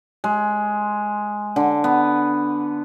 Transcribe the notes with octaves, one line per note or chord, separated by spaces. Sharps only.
G#3
D3
B3